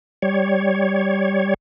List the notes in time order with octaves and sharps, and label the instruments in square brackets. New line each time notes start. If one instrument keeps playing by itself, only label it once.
[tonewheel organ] G3 C#5